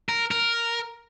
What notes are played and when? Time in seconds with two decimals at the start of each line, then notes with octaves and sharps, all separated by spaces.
0.09 A#4
0.31 A#4